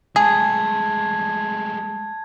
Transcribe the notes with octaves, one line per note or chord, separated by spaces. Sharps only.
G#3 A3 G#4 A5 G#6